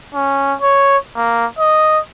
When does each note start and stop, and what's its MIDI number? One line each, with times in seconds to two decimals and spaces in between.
0.14 0.54 61
0.62 0.97 73
1.16 1.45 58
1.59 1.99 75